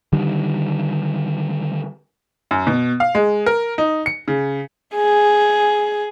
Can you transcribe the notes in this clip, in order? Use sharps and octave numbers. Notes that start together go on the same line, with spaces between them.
D3 D#3 G3
F#2
B2
F5
G#3
A#4
D#4
C#7
C#3
G#4